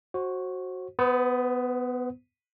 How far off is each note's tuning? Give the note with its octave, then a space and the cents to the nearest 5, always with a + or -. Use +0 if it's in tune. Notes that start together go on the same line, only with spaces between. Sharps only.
F#4 +0 C5 +30
B3 +10 C5 -35 D#6 +30